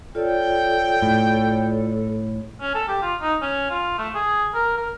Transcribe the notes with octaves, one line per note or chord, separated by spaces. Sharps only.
F4 A4 C#5 D5 G5
A2
C#4
A4
G4
F4
D#4
C#4
F4
A3
G#4
A#4
A#4